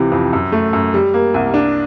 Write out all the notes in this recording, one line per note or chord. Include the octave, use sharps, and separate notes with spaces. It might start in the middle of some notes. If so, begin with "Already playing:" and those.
Already playing: C#2 C3 E3
F2
F#2
A3
F#2
G3
A#3
C2
D4